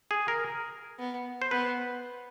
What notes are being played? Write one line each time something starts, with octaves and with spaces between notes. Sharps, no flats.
G#4
A#4
B3
C5
B3 B4